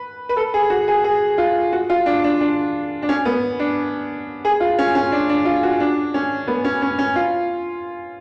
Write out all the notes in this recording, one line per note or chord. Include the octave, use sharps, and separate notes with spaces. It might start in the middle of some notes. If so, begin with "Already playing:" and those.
Already playing: B4
B4
A4
G#4
F#4
G#4
G#4
F4
F#4
F4
D4
D4
D4
D4
C#4
B3
D4
G#4
F4
C#4
C#4
D4
D4
F4
F#4
D4
C#4
B3
C#4
C#4
C#4
F4